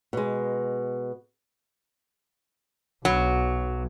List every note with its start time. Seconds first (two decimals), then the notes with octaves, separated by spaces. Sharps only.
0.13 B2 G#3
3.05 B1 F#3